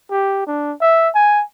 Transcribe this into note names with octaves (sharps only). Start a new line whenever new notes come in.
G4
D4
E5
G#5